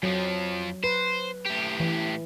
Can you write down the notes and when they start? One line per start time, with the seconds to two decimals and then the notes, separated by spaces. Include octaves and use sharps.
0.03 F2 F3 F#3
0.84 B4 C5
1.45 A2 G4
1.80 E3